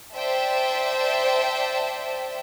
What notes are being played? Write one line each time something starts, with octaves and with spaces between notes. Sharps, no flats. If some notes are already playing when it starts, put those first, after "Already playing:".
C5 D5 E5 G5 A5